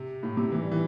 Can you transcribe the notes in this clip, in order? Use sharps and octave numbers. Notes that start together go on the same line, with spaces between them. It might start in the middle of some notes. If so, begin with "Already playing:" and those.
Already playing: C3
A2
C3
E3
G3
E3